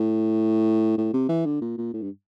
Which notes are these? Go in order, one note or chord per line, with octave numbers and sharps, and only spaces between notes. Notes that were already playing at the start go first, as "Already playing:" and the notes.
Already playing: A2
A2
C3
E3
D3
A#2
A#2
A2
G2